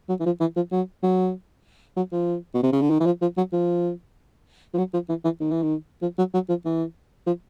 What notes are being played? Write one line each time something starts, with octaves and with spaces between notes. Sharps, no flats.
F#3
E3
F3
E3
F3
F#3
F#3
F#3
F3
B2
C3
C#3
D3
D#3
E3
F3
F3
F#3
F3
F3
F#3
F3
E3
E3
D#3
E3
D#3
F3
F#3
F#3
F3
E3
F3